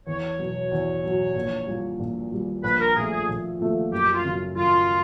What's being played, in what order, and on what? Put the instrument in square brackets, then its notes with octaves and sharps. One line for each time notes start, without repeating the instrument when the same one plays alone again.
[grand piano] E2 [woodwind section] C#5
[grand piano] B2 F#3
E2
B2 F#3
A#1
A#2 G3
A#1
A#2 G3
[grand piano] A#1 [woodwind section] B4
[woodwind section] A#4
[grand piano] A#2 F3 A3 [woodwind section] G#4
[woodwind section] G#4
[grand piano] A#1
A#2 F3 A3
[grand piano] F#2 [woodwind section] G4
[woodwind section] F4
[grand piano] C#3 F#3
[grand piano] F#2 [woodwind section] F4